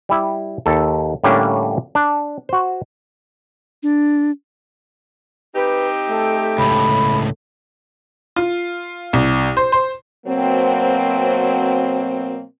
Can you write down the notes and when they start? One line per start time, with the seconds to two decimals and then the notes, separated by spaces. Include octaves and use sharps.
0.09 G3 E4
0.66 D#2 A4
1.24 A2 D3 G3 A#3 C#4 D4
1.95 D4
2.49 F#4 C5
3.83 D4
5.56 C4 D#4 G4 B4
6.09 A3 A4
6.58 C#2 A2 B5
8.36 F4
9.13 C2
9.57 C5
9.72 C5
10.26 B2 F#3 A#3 C4